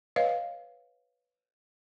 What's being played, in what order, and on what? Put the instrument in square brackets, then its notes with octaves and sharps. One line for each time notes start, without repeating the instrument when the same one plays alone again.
[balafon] B4 C#5 D#5 F5